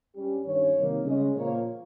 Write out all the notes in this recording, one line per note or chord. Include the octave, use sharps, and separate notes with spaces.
G2 G3 C#4 G4
G2 D#3 G3 C#4 C#5
C3 D#3 G3 A#3 D#4
C#3 G#3 C#4 D#5
A#2 F3 A#3 C#5